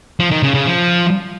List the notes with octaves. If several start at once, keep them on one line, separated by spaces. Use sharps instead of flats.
F3
D#3
C#3
C#3
F3